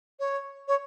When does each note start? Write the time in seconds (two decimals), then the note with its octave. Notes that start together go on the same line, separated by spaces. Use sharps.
0.20 C#5
0.68 C#5